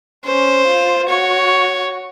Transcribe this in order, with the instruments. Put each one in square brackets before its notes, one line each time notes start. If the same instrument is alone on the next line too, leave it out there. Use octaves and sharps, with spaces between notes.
[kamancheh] C#4 [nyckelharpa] C5
[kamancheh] F4
[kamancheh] F#4 [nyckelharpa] C#5